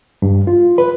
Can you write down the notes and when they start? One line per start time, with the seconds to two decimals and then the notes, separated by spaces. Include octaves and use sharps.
0.22 G2
0.47 F4
0.78 B4